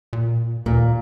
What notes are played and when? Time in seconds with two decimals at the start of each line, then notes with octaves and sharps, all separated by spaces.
0.13 A#2
0.66 D#2 A#2